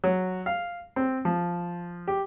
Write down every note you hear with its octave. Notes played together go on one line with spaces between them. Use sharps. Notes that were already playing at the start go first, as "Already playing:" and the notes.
F#3
F5
C4
F3
G4